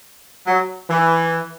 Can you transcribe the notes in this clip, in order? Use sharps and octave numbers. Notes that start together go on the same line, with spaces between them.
F#3
E3